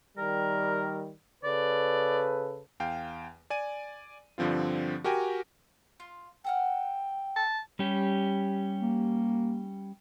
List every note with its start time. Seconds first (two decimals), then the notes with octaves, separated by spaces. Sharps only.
0.18 D#3 G3 A#4
1.44 C#3 A4 B4 D5
2.80 E2 F5 G5
3.50 D5 G#5 D#7
4.38 G2 D3 F3 C4 F4
5.04 F#4 G4 A#4 G5 G#5
6.00 F4
6.44 A4 F#5 G5 F6
7.36 A5
7.79 G3 C#4 G4
8.81 A#3